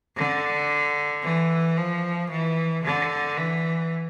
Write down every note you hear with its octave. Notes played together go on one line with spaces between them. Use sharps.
D3
E3
F3
E3
D3
E3